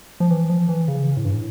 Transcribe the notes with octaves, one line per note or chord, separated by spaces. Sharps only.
F3
E3
F3
E3
C#3
A2
G2
A2